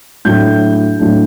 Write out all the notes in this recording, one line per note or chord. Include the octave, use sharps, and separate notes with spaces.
A2 F#3 A3 D4 G6
A2 F#3 A3 D4